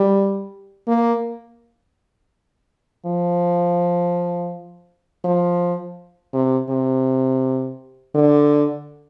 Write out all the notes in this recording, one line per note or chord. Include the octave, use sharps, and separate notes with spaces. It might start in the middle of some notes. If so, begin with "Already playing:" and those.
Already playing: G3
A#3
F3
F3
C3
C3
D3